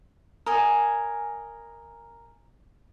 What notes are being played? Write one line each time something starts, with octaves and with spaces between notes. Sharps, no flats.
A#4 D#5 G#5